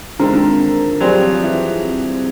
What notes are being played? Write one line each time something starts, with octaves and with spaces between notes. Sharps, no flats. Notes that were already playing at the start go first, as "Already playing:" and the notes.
D3 D#3 G#3 C4 F4 A#4
D3
F#3 G3 C4 F4 G#4
F3
E3